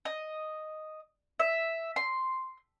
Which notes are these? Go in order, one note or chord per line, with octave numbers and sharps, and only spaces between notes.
D#5
E5
C6